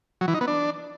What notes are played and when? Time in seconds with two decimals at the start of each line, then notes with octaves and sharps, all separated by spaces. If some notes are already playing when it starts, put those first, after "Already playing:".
0.21 F#3
0.28 E3
0.34 D#4
0.41 B3
0.48 D4